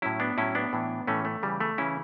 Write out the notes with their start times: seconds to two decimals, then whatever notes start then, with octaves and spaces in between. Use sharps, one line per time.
0.02 A2 F#3 C#4 E4
0.20 B3 D4
0.38 A2 F#3 C#4 E4
0.55 B3 D4
0.73 A2 E3
1.07 A2 E3 A3 C#4
1.25 A3
1.43 C#3 E3 G3
1.60 A3
1.78 C#3 E3 C#4 E4